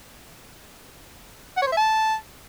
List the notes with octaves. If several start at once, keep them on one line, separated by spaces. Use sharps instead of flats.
F#5
C#5
C5
E5
A5